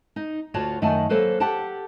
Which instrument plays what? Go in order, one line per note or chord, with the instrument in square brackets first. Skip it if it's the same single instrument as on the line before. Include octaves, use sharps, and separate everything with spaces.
[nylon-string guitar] D#4
D2 F4 F#4 C#5 A5
F#2 D#3 A3 F#5 G#5 A5
F#3 A#3 A4 B4 C5
G4 A4 F#5 G5 A5